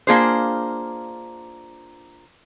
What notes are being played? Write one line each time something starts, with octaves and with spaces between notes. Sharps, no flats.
A#3 D4 F4 G#4 C5